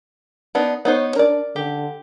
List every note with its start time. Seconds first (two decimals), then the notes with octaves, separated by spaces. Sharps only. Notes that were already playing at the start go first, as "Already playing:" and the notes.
0.55 B3 D4 D#4
0.85 B3 D#4 C5 C#5
1.16 D4 A#4 D5
1.56 D3 G4